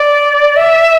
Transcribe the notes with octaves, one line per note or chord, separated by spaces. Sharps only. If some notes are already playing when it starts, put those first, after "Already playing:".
Already playing: D5
E5